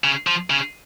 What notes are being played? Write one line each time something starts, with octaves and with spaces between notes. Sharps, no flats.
C#3
F3
C#3